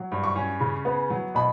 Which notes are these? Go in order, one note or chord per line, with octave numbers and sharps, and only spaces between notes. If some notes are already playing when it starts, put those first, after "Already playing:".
Already playing: F#3
G2
C#6
C#4
C#3
B3
F#3
B2 B5